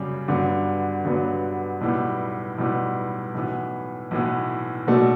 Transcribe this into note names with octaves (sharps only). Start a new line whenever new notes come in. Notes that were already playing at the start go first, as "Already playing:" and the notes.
Already playing: F#2 C#3 G3
G2 D3 F#3 B3
G2 D3 F#3 B3
B1 A2 G3 B3
B1 A2 G3 B3
B1 A2 E3 B3
B1 A2 E3 B3
B1 B2 F#3 A3 D4